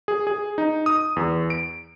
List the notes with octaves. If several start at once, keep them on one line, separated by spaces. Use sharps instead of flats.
G#4
G#4
D#4
D#6
E2
D7